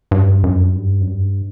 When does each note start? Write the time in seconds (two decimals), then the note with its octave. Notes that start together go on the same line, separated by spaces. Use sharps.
0.11 G2
0.44 F#2
0.76 G2
1.01 F#2
1.08 G2